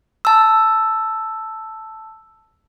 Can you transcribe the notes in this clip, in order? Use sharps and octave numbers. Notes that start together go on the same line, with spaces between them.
A5 E6